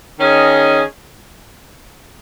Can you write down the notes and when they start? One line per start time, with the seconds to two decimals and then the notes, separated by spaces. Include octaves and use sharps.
0.18 D#3 C#4 G#4 D#5